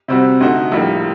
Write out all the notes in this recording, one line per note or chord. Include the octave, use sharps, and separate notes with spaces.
C3 G3 C4 F#4
D2 D3 A3 D#4 F#4
A#1 A2 G3 A#3